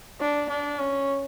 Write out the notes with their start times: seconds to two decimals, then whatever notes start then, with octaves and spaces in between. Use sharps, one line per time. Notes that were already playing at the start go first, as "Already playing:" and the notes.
0.20 D4
0.49 D4
0.79 C#4